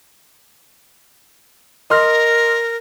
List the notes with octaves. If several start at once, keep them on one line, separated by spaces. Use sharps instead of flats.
A#4 D#5 C6 F6